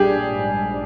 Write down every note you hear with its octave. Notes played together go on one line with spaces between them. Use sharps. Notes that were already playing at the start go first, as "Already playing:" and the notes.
Already playing: A#1 G3 D4 G4 G#4
G#2